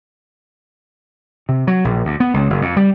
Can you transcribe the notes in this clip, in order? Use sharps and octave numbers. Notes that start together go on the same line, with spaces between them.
C3
F#3
A#1
D2
B3
C#2
F#1
F2
G3